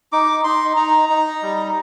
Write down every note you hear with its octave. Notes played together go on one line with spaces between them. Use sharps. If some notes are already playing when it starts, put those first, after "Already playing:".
D#4 D6
D#4 C6
D#4 A#5
D#4
G3